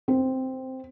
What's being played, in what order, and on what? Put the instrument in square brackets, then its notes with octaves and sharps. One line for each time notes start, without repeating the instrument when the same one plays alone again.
[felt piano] C4